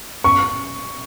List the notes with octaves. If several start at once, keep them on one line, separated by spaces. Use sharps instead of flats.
C#6